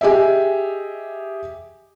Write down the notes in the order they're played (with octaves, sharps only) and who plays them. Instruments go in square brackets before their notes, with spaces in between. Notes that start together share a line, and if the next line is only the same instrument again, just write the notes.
[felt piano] G4 G#4 D#5 E5